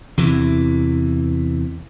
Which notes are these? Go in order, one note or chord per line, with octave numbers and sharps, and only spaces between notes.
E2 C3 E3